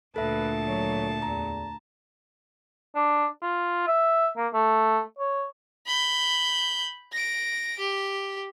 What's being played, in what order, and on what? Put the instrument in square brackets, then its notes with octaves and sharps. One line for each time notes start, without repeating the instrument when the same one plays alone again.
[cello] D2 A#2 [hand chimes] A4 E5 [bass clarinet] B4 [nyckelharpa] A5
[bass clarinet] F#3
[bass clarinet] E2 [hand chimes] A#5
[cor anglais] D4
F4
E5
A#3
A3
C#5
[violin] B5 G6
A#6 D7
G4